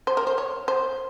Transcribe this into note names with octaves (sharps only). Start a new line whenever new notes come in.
C5
A#4
C5
C#5
C5